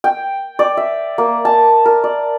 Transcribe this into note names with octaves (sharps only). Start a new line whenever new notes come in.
G5
D5
E5
A#3
A5
A#4
D5